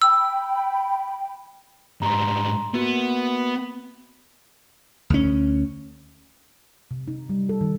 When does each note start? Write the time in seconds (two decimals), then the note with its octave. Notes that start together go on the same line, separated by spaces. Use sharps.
0.02 G5 B5 E6
2.02 G#2 G3 A#5 C6
2.74 A#3 B3 F#4
5.10 D2 C#4
6.91 C3
7.08 D#4
7.30 G3
7.49 A4
7.61 D#3